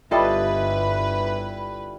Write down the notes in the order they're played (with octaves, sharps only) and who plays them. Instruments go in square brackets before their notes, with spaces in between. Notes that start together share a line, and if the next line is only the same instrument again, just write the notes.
[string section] G1 B4 [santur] G3 E4 [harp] F4 A4 D#5 [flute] E5